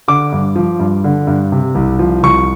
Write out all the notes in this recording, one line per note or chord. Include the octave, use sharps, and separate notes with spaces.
D3 D6
G2
F3
G2
D3
G2
C3
C2
F3
C2 C#6